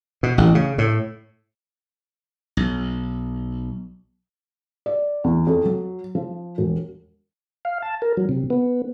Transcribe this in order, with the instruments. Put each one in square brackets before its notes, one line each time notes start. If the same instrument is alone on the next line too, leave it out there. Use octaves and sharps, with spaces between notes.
[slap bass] B2
A1
C#3
A2
B1
[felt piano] D5
E2
F2
F#3
F3
E1
[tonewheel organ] F5
A5
A#4
F#3
C3
B3